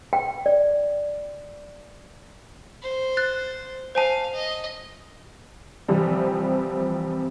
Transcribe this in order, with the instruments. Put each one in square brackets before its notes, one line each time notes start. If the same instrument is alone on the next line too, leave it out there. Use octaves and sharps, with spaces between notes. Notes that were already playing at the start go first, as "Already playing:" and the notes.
[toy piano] G5
D5
[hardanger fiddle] C5
[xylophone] F#6 A6
[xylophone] C5 G#5 A5 [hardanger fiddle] F5
[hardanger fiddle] D#5
[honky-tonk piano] C3 E3 F3 G3 C4